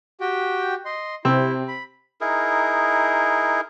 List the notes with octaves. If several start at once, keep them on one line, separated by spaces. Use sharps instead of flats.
F#4 G4 G5
D#5 C6
C3 C4 E4
B5
D#4 E4 G#4 A#4